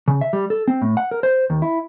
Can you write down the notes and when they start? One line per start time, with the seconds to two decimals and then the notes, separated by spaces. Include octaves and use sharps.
0.08 C#3
0.21 E5
0.33 G3
0.50 A4
0.68 C4
0.82 A2
0.97 F#5
1.11 A#4
1.23 C5
1.50 D#2
1.62 E4